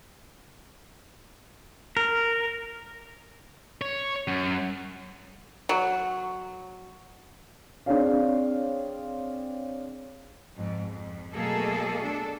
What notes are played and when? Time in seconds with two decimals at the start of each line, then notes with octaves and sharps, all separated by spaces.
1.97 A#4
3.81 C#5
4.28 F#2
5.69 F#3
7.86 C4 D4 G#4 C#5 F5
10.57 F2 G#2
10.91 F2
11.33 B2 F#3 A3 A#3 G#4 A4
12.03 D4 A4